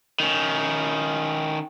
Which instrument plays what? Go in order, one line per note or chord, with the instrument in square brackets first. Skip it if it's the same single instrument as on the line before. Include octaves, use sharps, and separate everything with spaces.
[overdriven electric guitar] D#3 C#4